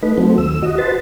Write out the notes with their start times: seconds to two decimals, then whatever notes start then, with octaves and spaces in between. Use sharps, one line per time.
0.03 A3 D#4 B4
0.18 F#3 A3 C4
0.38 D#2 E6
0.62 F#4 D#5
0.78 F#4 B4 C5 A5